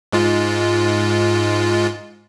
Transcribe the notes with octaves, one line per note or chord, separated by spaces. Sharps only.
G#2 G#3 F4